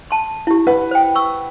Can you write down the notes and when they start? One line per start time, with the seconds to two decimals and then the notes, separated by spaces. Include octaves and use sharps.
0.11 A5 C6
0.47 E4 G4
0.67 B4 F#5
0.91 C5 G5
1.15 C#6 E6